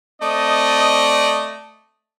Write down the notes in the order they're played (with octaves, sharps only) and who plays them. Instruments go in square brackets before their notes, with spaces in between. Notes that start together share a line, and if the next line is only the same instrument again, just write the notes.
[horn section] A3 C4 D5 D#5